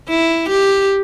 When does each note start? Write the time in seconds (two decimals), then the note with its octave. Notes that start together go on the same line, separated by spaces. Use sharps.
0.09 E4
0.50 G4